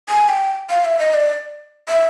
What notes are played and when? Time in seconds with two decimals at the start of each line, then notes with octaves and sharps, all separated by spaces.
0.09 G#5
0.29 G5
0.70 F5
0.85 E5
0.99 D#5
1.14 D5
1.89 E5